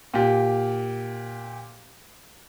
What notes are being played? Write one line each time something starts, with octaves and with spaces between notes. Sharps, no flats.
A#2 G4